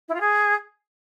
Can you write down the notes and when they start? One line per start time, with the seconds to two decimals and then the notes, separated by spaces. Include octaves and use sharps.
0.08 E4
0.14 F4
0.20 G#4